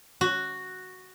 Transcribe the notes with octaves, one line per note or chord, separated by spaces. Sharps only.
F#4